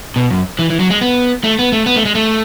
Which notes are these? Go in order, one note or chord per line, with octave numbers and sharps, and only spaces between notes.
B2
F#2
E3
E3
F#3
G#3
B3
A3
B3
A3
B3
A3
G#3
A3